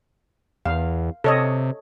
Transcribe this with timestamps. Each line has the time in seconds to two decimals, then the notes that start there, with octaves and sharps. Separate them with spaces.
0.65 E2 F5
1.24 C3 A4 C#5 D#5